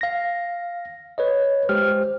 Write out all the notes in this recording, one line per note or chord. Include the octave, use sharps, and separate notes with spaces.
F5 A#6
B4 C#5 D#5
G#3 G4 C5 G5 F6